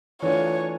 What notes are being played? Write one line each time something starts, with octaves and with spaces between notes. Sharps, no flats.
E3 A3 D4 F4 C#5